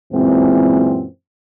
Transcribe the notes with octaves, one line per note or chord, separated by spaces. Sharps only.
F#2 A#2 E3 G#3 C4